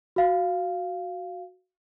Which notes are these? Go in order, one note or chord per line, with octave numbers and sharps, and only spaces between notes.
F#4 F5